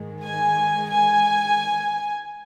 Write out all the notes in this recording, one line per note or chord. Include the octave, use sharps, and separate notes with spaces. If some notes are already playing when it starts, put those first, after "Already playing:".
Already playing: G#2 D#3 G#3
G#5
G#5